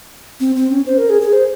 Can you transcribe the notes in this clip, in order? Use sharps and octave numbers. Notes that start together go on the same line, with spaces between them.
C4
C4
C#4
C5
A#4
G#4
G#4
C5